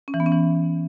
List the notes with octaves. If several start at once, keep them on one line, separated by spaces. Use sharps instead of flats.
C#4
E3
B3
C#4
E3